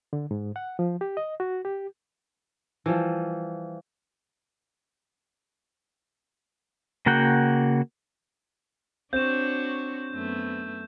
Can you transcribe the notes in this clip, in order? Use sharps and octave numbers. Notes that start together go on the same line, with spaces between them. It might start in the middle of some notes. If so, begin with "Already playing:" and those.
D3
G#2
F#5
F3
G4
D#5
F#4
G4
E3 F3 G3
C#3 A#3 F#4 F#5 G5
C4 D4 F#4 C#5 G6 E7
F#2 A3 B3